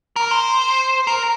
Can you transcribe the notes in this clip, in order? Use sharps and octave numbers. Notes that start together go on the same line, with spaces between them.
A#4
C5
A#4